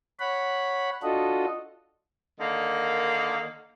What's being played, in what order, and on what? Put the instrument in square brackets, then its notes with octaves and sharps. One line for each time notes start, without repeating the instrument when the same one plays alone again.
[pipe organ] C#5 F#5 B5
D4 F4 F#4 A4 D#5
[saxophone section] D3 D#3 A#3